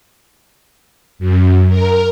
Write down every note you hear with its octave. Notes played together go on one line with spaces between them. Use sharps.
F#2
A#4